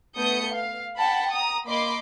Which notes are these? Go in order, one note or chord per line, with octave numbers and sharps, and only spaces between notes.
A3 B3 D#6 G6 C#7
F5
F#5 G5 A5 B5
A#5 D#6
A#3 D#5 B5 C6 D6